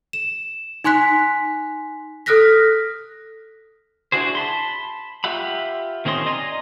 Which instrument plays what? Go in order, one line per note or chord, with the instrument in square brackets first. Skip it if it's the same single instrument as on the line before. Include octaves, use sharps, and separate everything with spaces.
[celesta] E7
D#4 G#5 C6 F#6 B6
A4 D#6 F6 F#6 A#6 B6
[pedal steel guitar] D4 E4 F#4 G#4 C5
A5 B5 C6
F4 G4 E5 F#5 B5
D#3 C4 C#4 D#5 C6
D5 D#5 G#5 A#5 C6